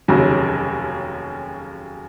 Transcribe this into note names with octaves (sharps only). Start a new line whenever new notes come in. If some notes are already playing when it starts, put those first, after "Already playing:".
F1 D#2 C#3 F#3